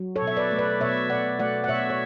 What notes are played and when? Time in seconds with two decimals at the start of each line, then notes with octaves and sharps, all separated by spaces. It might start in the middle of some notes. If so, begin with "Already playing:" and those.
Already playing: F#3
0.16 A4 C#5
0.22 B2
0.27 E5
0.37 B4 D5
0.52 A3
0.59 B4 D5
0.80 B2 C#5 E5
1.10 B2 D5 F#5
1.39 A3 D5 F#5
1.64 F#5
1.68 B2 C#5 E5
1.90 C#5